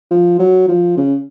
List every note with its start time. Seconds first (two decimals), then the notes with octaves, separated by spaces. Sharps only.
0.11 F3
0.40 F#3
0.68 F3
0.97 C#3